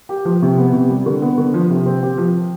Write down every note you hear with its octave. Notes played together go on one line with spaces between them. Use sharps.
G4
F3
C3
B3
C3
G3
D3
B3
D3
F3
C3
C4
G4
F3